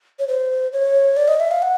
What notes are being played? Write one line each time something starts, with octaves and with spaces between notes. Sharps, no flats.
C#5
C5
C#5
D5
D#5
E5
F5
F#5